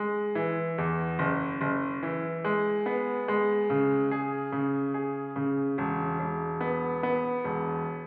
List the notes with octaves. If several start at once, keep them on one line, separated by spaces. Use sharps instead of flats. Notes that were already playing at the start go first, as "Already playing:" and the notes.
Already playing: G#3
E3
E2
F#1
F#1
E3
G#3
B3
G#3
C#3
G#4
C#3
G#4
C#3
E1
E1
B3
B3
E1